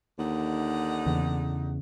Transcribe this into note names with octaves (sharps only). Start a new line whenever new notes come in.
D#2 D3 D#4 F#5
E2 C#3